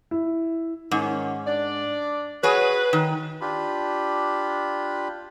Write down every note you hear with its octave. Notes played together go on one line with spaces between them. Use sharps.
E4
G#2 D#3 C#4
D4 D5
F#4 G#4 B4 C#5
D#3
D4 F4 G4 B5